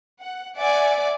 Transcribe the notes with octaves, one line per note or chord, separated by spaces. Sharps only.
F#5
D5 E5 F#5 G#5 D6